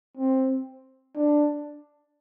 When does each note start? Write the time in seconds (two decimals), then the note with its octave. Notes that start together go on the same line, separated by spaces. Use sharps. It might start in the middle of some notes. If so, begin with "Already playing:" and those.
0.17 C4
1.15 D4